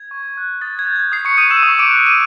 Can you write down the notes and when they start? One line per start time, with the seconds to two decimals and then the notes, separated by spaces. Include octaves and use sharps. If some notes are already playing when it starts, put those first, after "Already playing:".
Already playing: G#6
0.11 C#6
0.37 F#6
0.61 D#6 A6
0.79 G#6
0.87 G6
0.96 G#6
1.12 D#6 C7
1.25 C#6 C#7
1.38 D#6 G6 D#7
1.51 E6 E7
1.63 C#6 D#6 D#7
1.79 D6 D7
1.88 F#6
2.07 D#7